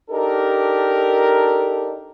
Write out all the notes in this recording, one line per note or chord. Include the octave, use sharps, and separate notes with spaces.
D4 D#4 G4 A4 A#4